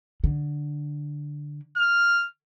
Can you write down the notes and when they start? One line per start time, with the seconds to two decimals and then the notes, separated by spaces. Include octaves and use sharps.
0.24 D3
1.77 F6